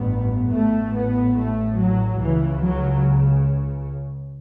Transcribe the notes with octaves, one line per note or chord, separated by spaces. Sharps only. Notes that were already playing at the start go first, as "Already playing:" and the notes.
Already playing: A1 G2 B3
A1 A2 A3
B3
A3
F#3
C#2 C#3 E3
F#3